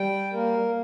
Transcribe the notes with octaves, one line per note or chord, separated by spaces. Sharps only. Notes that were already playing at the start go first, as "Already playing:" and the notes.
Already playing: G3 G5
A#3 A#4